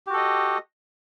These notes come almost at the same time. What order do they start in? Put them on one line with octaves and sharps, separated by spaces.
G4 F#4 A4 D#5